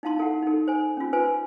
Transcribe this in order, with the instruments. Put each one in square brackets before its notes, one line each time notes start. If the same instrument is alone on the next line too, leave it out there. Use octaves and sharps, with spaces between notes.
[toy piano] D#4 E4 F5 A5 C6
A4 F#5
D#4 A4
C5 G#5
C#4 F4
B4 C5 G#5